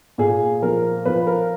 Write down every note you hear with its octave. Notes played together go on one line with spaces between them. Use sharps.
A#2 G#4
F3 A#4
F3 B4
A#4